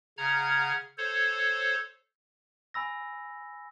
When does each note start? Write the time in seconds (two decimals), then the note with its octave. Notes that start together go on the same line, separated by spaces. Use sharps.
0.18 C#3 F#5 A#5 F6 G#6
0.98 A4 C5 C#5
2.74 G#5 B5 E6 A#6